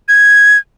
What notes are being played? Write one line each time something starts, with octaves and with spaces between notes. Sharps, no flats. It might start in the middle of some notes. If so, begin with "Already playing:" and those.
G#6